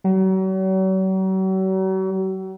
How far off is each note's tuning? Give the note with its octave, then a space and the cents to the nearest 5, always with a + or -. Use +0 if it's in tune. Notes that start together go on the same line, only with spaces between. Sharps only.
F#3 +40